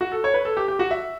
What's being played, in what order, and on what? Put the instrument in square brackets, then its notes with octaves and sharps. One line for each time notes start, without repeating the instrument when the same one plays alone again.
[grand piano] F#4
A4
C#5
B4
A4
G4
G4
F#4
E5